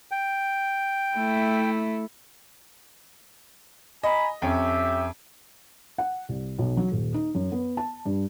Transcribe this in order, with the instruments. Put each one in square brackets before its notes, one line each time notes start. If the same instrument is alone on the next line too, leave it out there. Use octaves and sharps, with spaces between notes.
[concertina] G5
[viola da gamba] A3 E4
[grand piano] D#5 [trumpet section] G#5 A#5 B5
[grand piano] F2 C#4 [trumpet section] G4 E5
[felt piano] F#5
C2
B1
F#3
D#1
D#4
F#2
B3
A5
G2